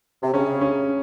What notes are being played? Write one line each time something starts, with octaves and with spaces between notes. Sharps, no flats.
C3
C#3 C#4
C#4